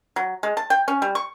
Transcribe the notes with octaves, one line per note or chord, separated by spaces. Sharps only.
F#3
G#3
A5
G5
C#4
G3
C#6